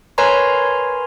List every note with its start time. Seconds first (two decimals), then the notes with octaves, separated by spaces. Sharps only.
0.18 A#4 B4 C#5 G#5 A#5 C6